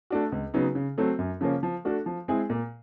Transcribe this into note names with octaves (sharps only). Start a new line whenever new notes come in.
A3 D4 F#4
C#2
C#3 F#3 B3 D#4
C#3
F#3 A3 C4
F#2
C#3 F3 A#3 C#4
F3
A3 D4 F#4 A4
F3
G#3 C4 E4 G#4
A#2